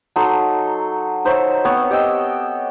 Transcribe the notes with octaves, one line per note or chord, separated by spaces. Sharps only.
F#3 D#4 A4 C6
D#4 C5 C#5 E5
B3 C4 C#5
G4 D#5 G5 E6